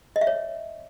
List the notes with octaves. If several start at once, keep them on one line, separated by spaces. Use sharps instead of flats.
D#5
E5
C#5